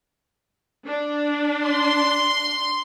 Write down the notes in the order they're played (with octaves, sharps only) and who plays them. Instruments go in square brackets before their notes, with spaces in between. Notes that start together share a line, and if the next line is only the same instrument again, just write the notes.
[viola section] D4
[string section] C6